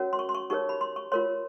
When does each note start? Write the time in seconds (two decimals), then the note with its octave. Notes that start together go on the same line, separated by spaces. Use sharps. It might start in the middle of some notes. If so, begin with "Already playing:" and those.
Already playing: C#4 F#4 A#4 C#5
0.13 C6
0.19 C#6
0.29 C6
0.34 C#6
0.50 D#4 G4 A#4 C#5 C#6
0.69 B5
0.81 C6
0.96 C#6
1.12 F4 A#4 C#5 C6